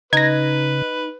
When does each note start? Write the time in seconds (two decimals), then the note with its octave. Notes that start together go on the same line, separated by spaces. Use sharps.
0.13 C#3 D#4 B4 G#6 A#6